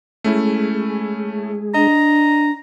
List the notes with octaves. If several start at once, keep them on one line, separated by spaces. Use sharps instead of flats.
G#3 A3 C#4 E4 G#4
D4 D#5 A#5